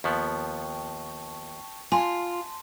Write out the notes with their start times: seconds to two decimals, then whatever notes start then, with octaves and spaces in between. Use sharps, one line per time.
0.04 D#2 F3 B3 G5 A5 C#6
1.92 F4 G#5 A5 C6